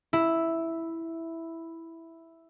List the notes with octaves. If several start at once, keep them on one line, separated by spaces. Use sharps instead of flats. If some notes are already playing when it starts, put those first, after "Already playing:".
E4